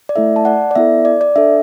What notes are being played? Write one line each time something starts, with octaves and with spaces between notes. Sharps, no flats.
D5
A3 E4 A4 E5
A5
D5 F#5
D5
B3 E4 A4 E5
D5
D5
D4 A4 E5